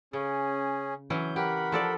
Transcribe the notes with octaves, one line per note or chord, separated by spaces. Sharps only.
C#3 C#4 G#4
E3 F#3 C#4 G6
G4 A#4 F#5 B5
F3 A4 D5